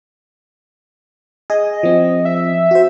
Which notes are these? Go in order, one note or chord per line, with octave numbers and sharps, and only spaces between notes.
G#4 D#5
F3 C4
E5
F#4 C5